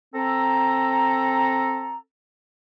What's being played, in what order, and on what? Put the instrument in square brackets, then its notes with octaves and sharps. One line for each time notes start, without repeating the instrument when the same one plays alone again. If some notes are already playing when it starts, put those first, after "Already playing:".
[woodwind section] C4 A4 A#5